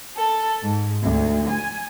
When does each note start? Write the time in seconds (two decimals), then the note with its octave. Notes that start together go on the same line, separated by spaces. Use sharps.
0.17 A4
0.64 G#2
1.02 D2
1.50 G#5